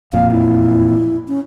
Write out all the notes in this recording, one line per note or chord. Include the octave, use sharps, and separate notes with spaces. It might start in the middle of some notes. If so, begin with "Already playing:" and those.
E1 F2 A#2 F5
E4
C#4